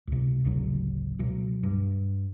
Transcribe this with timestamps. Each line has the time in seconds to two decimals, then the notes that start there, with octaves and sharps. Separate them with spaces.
0.07 C#2 C3
0.44 D1 G#1 C#3 F#3
1.19 C#2 B2 F#3
1.63 G2